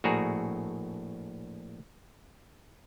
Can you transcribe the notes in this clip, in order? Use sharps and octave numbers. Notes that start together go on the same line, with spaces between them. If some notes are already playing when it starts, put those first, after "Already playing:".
A#1 A2 F#4 G#4 A#5